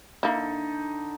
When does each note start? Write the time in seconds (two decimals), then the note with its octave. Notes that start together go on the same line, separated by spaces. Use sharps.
0.23 D3 A#3 D#4 E4 A4